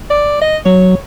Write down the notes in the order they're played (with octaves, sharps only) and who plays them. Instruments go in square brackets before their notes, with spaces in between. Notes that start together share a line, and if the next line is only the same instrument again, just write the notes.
[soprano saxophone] D5
D#5
[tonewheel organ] F#3 [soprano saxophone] C#5